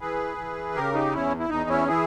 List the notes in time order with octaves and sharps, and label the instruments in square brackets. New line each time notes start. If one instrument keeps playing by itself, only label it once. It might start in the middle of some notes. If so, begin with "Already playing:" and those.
[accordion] E3 G#4 B4
E3
C#3 G4 A#4
D#4 G4
E2 C#4 E4
E4
E2 D#4
C#4 E4
E3 E4 G#4